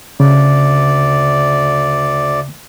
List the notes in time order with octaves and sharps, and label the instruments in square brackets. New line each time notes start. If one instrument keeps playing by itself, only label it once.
[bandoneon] D2 D5 [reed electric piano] C#3